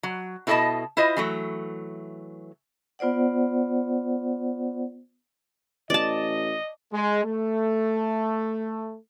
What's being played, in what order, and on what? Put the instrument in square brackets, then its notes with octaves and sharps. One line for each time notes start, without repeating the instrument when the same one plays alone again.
[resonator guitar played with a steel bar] F#3
B2 E4 A4 B4 D#5 A5
E4 F4 C5 D#5
E3 F#3 A3
[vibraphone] B3 F4 C5 D5 F#5
[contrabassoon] A1 [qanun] D5 A5 [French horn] D#5
[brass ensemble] G#3
A3